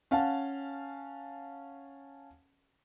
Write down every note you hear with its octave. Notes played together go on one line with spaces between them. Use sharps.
C#4 F5 F#5 A5